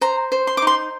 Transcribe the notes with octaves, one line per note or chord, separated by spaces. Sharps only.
C5 A#5
C5
C6
D6
D#4 C6